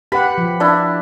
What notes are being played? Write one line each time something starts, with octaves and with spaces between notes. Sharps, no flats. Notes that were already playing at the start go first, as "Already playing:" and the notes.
G4 B4 F#5 B5
F3
D4 E4